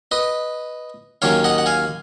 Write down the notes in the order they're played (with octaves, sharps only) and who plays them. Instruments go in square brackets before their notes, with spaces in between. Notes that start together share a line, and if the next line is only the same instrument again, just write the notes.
[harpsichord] B4 D#5
D#2 D#3 F#3 C#4 C#5 F5
D#5 F#5
F#5
F5 G#5